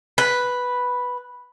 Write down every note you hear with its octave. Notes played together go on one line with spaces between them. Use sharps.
B4